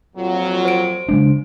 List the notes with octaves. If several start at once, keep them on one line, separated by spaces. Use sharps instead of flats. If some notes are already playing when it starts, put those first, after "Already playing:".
F2 A#2 F#3
C5 D7
C#3 G#3 D4